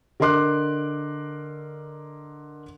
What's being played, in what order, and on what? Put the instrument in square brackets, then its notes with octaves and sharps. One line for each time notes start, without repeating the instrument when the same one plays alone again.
[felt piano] D3 A#4 D#5 C6 D6 F#6